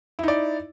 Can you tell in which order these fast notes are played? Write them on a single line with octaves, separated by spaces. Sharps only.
E4 D#4 D5